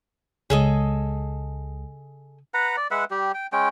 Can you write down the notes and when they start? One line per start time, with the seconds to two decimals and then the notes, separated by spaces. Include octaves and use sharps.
0.50 C#2 C#3 G#3 G#4 A4 D#5
2.54 B4 F#5 A#5
2.77 D5
2.91 G#3 B4 E5 F#5
3.11 G3 G4
3.34 G5
3.53 G#3 C#4 G5